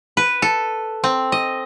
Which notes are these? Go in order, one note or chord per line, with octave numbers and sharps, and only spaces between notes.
B4
A4
C4
D#5